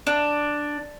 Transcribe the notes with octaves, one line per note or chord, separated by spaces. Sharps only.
D4